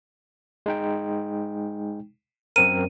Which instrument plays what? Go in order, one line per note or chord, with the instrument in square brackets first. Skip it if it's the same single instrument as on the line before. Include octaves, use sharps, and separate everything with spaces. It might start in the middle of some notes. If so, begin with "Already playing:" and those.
[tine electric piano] G#3 D#4 G5
[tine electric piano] F#2 C4 A#4 [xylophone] D#7